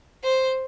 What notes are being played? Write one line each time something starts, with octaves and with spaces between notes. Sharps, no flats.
C5